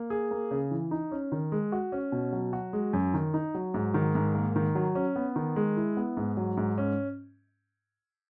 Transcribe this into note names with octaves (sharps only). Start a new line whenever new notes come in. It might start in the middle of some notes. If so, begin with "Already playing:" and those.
Already playing: A#3
G#4
A#3
C#3
E3
D#4
C#4
D#3
G#3
F#4
C#4
B2
F#3
F#4
G#3
F#2
D#3
D#4
F#3
G#2
D#3
G#2
A#3
D#3
F#3
C#4
B3
D#3
G#3
E4
B3
G#2
F#3
G#2
C#4